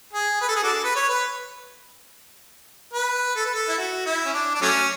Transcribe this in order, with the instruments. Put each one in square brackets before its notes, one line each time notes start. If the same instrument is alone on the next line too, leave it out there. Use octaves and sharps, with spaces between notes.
[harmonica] G#4
B4
A4
G#4
D4 F#4 A4
B4
C#5
B4
B4
A4
B4
A4
E4
F#4
E4
C#4
D4
D4
F#3 A3 C#4